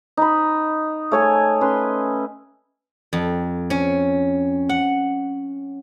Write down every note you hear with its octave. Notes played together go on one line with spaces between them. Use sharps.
D#4 B5
A3 C#5 G#5
C#4 B4 C6
F2
C#4
F#5